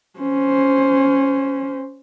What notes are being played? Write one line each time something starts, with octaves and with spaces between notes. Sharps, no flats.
C#4 C5